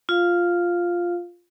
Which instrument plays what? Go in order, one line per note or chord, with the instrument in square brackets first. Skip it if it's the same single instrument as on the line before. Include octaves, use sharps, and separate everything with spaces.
[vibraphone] F4 F5